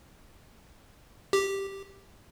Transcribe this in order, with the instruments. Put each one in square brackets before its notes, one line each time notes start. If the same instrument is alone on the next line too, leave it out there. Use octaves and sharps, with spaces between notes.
[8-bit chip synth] G4